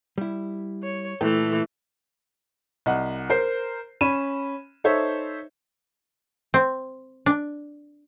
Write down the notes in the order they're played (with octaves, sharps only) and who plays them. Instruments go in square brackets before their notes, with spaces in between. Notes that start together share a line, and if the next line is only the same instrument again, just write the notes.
[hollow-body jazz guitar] G3 E4
[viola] C#5
[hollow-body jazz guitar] A#2 A4 G5 [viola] E3 A3
[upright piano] C2 D#5 F#5
A#4 C5 C7
C#4 B5 D#7 E7
D#4 A4 C5 C#5 E5
[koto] C4
D4